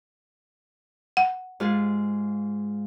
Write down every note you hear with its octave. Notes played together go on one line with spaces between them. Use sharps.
F#5
G#2 F4 G#4